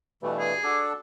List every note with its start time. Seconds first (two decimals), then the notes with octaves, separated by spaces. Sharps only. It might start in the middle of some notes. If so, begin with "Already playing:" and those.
0.23 G2 B2 E3 A3
0.39 G#4
0.64 D4 F#4 A4 A5 D6